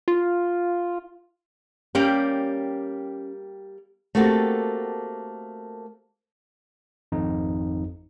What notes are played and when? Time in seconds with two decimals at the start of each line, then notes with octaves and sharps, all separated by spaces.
0.08 F4
1.95 G3 A#3 C#4 G4
4.15 A3 A#3 C4 F#4 G4 A4
7.12 G#1 F2 D#4